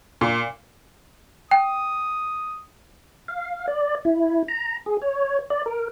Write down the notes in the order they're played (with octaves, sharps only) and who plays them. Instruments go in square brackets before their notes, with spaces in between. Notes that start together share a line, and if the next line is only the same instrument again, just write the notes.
[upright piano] A#2
[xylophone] G5 [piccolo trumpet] D#6
[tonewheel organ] F5
D5
E4
A#5
G#4
C#5
D5
A#4